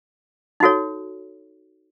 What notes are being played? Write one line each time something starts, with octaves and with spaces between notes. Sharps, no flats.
D#4 F#4 A4 C#5